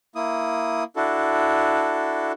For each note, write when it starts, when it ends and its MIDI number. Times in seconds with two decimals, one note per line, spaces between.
0.15 0.84 58
0.15 0.84 64
0.15 0.84 87
0.96 2.32 62
0.96 2.32 64
0.96 2.32 66
0.96 2.32 69